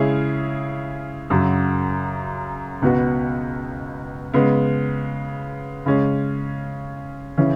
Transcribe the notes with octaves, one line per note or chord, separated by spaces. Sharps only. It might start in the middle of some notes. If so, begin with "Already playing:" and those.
Already playing: C#3 G#3 C#4 E4 G#4
F#2 C#3 F#3
C#2 B2 B3 F#4 B4
C#3 G#3 B3
C#3 G#3 C#4
C#3 E3 C#4